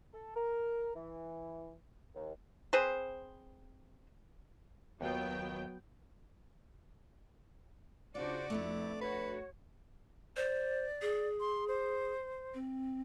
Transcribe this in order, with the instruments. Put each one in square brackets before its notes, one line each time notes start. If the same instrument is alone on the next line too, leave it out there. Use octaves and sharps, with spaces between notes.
[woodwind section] A4
A#4
E3
D#2
[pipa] C4 G#4 B4 C5
[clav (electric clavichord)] D#2 F4 [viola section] F#3 B3 G5
[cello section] C#3 D4 F#4 [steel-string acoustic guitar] F4 [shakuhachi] C5 [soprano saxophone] D5
[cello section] F2 [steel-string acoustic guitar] A3 B3 D4 [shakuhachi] E4
[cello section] F#4 [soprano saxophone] B4 [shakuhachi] C#5
[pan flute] C5 [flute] D5
[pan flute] G#4
[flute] C6
C5
[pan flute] C4